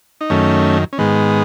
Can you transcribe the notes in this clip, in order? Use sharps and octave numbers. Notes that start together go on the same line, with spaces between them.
D#4
F#2 D#3 A3 C#4
C#4
G#2 D#3 G#3 B3